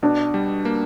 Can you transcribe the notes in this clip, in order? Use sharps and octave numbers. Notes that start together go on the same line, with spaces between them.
B2 D4
G3
A#3